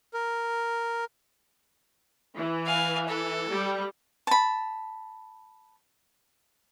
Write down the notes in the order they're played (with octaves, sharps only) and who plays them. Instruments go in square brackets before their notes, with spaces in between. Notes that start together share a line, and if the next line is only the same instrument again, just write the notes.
[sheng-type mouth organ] A#4
[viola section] E3
[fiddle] F5 G#5
A4
[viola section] G3
[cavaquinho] A5 B5